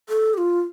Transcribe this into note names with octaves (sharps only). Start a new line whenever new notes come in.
A4
G4
F4